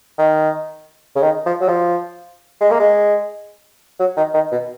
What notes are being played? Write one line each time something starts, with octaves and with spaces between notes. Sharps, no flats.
D#3
C#3
D#3
F3
F#3
F3
G#3
A#3
G#3
F#3
D#3
D#3
B2